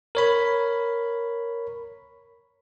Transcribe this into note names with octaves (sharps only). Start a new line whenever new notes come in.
A#4 C#5 B5